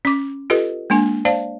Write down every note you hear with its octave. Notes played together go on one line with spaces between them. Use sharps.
C#4 D6
F4 G4 A4 B4 D#5
G#3 A#3 D4 G#5
C5 D5 F5 A5